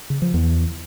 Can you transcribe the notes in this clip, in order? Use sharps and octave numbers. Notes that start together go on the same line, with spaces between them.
C#3
F3
E2